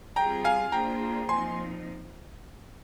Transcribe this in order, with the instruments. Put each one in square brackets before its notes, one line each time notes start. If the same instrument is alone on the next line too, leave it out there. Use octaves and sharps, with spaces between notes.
[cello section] G3 C4 F4 G#4 [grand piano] G5 A#5
[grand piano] F5 G#5
[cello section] A#3 D4 F4 G#4 C5 [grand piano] G5 A#5
[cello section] A#2 F3 C4 D#4 [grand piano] G#5 C6